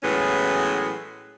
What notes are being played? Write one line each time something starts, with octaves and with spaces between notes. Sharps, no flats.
A2 E3 F#3 G#3 B3 C#4